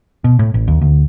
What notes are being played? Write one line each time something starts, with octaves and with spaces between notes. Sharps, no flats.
B2
A2
A1
D#2
D2